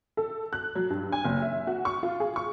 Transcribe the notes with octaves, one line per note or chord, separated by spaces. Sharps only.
A4
F#6
F#3
G2
G#5
F#1
E5
F#4
C#6
F4
G#4
C#6